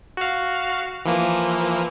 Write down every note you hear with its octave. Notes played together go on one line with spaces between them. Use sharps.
F#4 F5
E3 F3 A#3